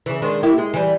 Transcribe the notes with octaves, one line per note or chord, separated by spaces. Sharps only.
C#3 E3
D#3 G#3 D4
A#3 E4 G4
G#3
E3 G3